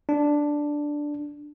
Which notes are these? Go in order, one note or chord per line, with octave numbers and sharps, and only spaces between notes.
D4